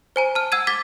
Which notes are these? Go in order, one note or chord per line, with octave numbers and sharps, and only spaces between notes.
C5 G#5 A#5
A5 F6
F#5 E6 G#6 D#7
D6 G#6 A6 B6